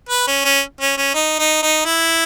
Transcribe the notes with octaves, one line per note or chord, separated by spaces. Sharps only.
B4
C#4
C#4
C#4
C#4
D#4
D#4
D#4
E4